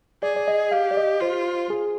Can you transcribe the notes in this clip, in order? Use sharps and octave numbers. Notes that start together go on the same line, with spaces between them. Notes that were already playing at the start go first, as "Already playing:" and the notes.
G#4 D5
D5
D#5
G4 F5
D5
D#5
F4 C5
G#4